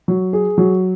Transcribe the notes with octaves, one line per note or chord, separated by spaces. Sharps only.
F#3
G#4
F#3